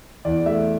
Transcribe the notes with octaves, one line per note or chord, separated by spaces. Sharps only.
E2 D5
A3 E5